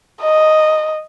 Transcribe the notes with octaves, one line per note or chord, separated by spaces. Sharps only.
D#5